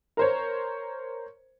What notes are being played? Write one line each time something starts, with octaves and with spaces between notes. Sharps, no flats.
A#4 C5 C#5